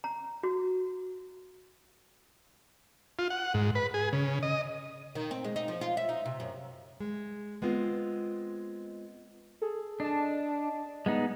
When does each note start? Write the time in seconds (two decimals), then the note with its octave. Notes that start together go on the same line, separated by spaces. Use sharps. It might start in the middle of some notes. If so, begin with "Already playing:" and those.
0.04 A#5
0.43 F#4
3.19 F4
3.30 F#5
3.54 G#2
3.75 B4
3.94 G#4
4.13 C#3
4.43 D#5
5.15 D#3
5.31 C4
5.44 G#3
5.56 D#4
5.68 F3
5.81 F4
5.97 E5
6.09 D#4
6.25 C3
6.40 F#2
7.00 G#3
7.62 G#3 B3 C4 F4
9.62 G#4 A4
10.00 D4 D#5 A5
11.06 G#3 B3 D#4